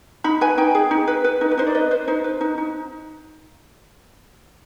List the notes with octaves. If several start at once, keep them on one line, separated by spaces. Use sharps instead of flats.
D#4 B5
B4 G#5
D#4 G5
G#4
D#4
B4
B4
D#4
B4
D#4 C5
D5
B4 D#5
B4 C5
D#4 C5
B4
D#4
D#4